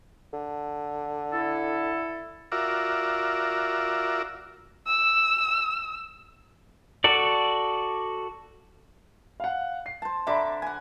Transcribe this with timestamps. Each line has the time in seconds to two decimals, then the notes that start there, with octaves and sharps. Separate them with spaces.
0.33 D3
1.32 E4 A4
2.52 F4 F#4 A#4 D5 E5
4.87 E6
7.04 F#4 A4 D5
9.40 F5 F#5
9.86 C7
10.02 C5 A5
10.27 D3 E5 A#5 B5 D6
10.62 F#5 G#5